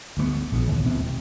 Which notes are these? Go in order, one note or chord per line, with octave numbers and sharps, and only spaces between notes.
D2 G3 B3
A#1 B3
D#2
D#1 C3 B3